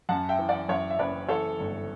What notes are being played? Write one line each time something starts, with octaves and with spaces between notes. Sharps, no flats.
F#2 F#5 A5
E5 G5
E3
D5 F#5
F#2 C#5 E5
E5
F#1 B4 D5
E3 A4 C#5
G1